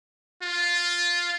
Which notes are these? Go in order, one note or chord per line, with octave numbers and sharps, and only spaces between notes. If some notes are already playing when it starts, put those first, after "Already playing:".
F4